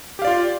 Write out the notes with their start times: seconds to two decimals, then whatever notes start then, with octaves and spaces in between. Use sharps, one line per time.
0.19 G4
0.22 F5
0.24 D5
0.27 F4